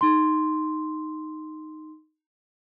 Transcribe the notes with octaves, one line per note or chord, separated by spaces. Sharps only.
D#4 C6